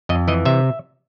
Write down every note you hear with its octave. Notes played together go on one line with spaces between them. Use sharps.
F2 D#5
E3 D#5
C3 E5